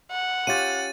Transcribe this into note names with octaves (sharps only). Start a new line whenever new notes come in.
F#5
C#4 F4 G4 A6 D#7